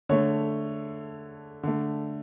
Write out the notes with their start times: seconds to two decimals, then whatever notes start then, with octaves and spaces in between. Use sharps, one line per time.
0.09 D3 A3 C#5
1.63 D3 A3